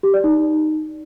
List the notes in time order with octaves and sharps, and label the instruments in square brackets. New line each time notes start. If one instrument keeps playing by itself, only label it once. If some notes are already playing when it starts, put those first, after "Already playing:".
[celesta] G4
D5
D#4